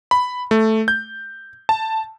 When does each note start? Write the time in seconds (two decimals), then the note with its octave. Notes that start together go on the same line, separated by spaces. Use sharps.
0.11 B5
0.51 A3
0.88 G6
1.69 A5